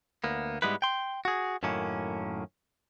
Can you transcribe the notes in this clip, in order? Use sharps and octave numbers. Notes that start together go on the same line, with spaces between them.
D2 A#3 B3
G#2 G3 G#3 B3 E4 B4
G5 C6
F#4 G#4
F#2 A2 D#3 A#3 C#4